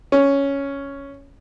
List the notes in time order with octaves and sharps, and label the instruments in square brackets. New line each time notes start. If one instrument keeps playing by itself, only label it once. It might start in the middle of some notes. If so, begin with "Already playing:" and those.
[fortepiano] C#4